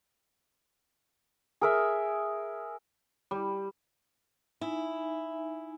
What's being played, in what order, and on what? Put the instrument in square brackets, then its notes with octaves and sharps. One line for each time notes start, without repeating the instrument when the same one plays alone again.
[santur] G#4 A#4 E5
[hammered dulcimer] G3
[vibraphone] D#4 E5 G#5 [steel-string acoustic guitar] E4